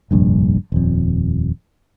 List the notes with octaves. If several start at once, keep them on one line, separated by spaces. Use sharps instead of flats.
F1 A#1 G2
D#1 F2